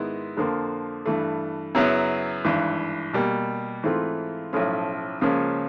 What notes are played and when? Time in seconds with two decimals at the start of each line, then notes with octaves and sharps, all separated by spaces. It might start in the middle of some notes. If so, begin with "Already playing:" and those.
Already playing: G#2 D#3 G#3 B3 E4
0.37 F2 D3 F3 A#3
1.05 G2 E3 A3
1.75 F#2 C#3 F#3 B3 E4
2.45 G#1 G2 E3
3.13 B2 G3 A#3
3.83 G#2 E3 A3 C4 F4
4.53 B1 A2 F3 A3 C#4
5.21 C#2 C#3 F3 A#3 C#4